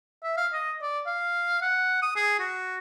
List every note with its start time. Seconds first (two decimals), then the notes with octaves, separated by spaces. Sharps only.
0.23 E5
0.37 F5
0.53 D#5
0.82 D5
1.07 F5
1.62 F#5
2.03 D#6
2.16 G#4
2.39 F#4